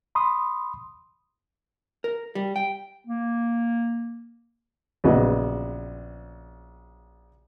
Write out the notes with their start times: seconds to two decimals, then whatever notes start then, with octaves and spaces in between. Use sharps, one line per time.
0.15 B5 C6 D#6
2.04 A#4
2.35 G3
2.56 G5
3.07 A#3
5.04 A#1 C#3 F#3 B3 D#5